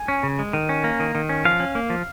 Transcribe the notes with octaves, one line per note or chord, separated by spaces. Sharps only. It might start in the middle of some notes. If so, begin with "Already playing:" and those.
Already playing: G#5
C#4
C#3
G#3
D#3
C#4
A#3
D#3
D#3
C#4
F3 F5
C#4
A#3
F3